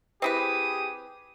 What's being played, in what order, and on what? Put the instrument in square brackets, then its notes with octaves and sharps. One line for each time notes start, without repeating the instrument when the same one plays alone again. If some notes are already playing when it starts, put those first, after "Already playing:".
[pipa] C4 E4 B4 [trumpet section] G4 G#4 D#6